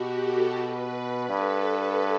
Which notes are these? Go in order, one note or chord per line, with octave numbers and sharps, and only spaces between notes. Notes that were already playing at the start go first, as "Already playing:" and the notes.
Already playing: B2 F#4 G4
A4
B4
G2 A4